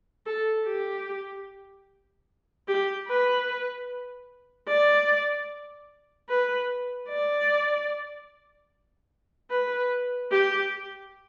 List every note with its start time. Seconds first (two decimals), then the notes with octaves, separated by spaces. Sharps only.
0.26 A4
0.67 G4
2.68 G4
3.08 B4
4.68 D5
6.29 B4
7.09 D5
9.50 B4
10.32 G4